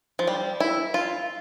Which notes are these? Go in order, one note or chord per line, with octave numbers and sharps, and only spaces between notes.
F3
G3
E4
F4